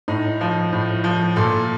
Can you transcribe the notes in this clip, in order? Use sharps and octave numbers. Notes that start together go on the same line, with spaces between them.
A2 D#4
F3
A2
F3
A#2 A4